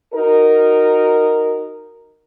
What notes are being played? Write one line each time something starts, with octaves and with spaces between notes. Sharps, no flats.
D#4 F#4 A#4